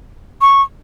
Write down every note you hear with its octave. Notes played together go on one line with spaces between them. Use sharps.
C#6